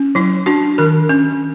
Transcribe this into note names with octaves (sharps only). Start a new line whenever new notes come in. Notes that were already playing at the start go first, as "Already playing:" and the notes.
Already playing: C#4
F#3 E4
D4 F#4
D#3 A#4
C#4